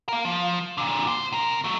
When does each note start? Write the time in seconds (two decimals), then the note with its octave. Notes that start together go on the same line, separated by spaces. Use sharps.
0.09 A#4 F5
0.25 F3
0.78 A#2 D3
1.08 C5
1.32 C3 A#4
1.64 F#3 A3